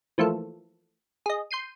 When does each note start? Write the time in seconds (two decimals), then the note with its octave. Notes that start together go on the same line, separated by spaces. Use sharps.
0.18 E3 F3 A3 A#3 A4
1.26 G#4 D#5
1.51 C6 G6 C7 D#7